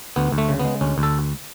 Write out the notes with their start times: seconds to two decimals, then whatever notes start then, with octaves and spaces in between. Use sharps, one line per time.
0.16 D2 B3
0.32 D2
0.38 A3
0.49 C#3
0.60 B3
0.65 G#3
0.81 D2 C#4
0.98 D2
1.03 A4